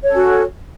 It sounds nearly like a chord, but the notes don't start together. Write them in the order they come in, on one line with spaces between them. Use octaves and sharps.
C#5 A4 C#4 F#4